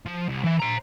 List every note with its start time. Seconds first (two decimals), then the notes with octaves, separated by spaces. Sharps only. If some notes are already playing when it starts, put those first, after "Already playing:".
0.06 F3
0.29 C2
0.45 E3 E5
0.60 C5 A#5